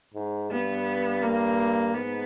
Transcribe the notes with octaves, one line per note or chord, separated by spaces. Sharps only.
G#2
G2 B3
A#3
G#2 B3